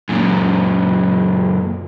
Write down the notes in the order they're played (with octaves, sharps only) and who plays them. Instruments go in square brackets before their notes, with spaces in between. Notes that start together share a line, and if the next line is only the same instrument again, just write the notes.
[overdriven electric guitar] F#2 A#2